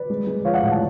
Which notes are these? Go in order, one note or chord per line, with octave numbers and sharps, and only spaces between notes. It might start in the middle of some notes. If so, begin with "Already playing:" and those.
Already playing: B4 D5
G#3
G#3
F3 C#5 F5
D5 F#5
A2
F#5 A5